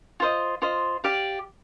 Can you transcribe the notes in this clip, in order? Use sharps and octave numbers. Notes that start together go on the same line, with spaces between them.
F4 C5 D#5
F4 C5 D#5
G4 D5 F5